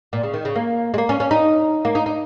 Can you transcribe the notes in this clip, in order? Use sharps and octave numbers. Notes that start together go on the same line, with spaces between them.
A#2
C#3
D#3
C#3
A#3
G#3
A#3
C#4
C#4
D#4
A#3
D#4
D#4